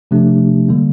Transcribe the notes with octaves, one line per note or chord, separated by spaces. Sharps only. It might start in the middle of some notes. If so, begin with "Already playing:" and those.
C3 F3 A3 D4 G4
D3 G3 A#3